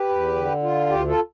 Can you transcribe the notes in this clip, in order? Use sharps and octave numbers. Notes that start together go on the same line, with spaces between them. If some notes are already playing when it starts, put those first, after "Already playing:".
Already playing: G4 B4
E2
D3
F4
D2 G4
F4 A4